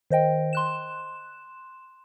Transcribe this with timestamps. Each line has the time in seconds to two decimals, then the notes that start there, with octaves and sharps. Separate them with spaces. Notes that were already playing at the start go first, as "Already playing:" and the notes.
0.11 D#3 C5 D#5 G5
0.53 C6 F#6 E7